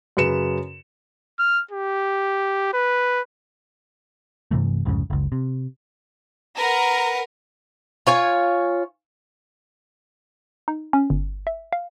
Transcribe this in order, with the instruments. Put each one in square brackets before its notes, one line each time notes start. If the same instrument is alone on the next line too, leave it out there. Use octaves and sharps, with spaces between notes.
[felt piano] F#2 C#3 B4 C#7 E7
[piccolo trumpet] F6
G4
B4
[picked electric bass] G2 C3 E3 A3
C2 F2 G#2 C#3
F#1 C#2
C3
[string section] A#4 [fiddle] B4 F#5
[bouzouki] F4 C#5 G#5
[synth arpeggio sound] D#4
C#4
G1
E5
F5